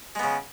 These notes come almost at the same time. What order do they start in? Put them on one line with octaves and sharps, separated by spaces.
G#3 B3 C#3